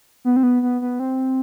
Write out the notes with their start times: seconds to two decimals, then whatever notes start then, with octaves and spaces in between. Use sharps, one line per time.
0.25 B3
0.36 C4
0.43 B3
0.62 B3
0.81 B3
1.00 C4